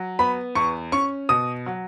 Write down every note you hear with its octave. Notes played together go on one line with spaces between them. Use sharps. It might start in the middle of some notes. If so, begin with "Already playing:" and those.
Already playing: F#3
B3 B5
E2 C#6
C#4 C#6
B2 D#6
F#3